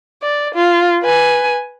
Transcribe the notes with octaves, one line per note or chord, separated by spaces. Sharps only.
D5
F4
B4 G#5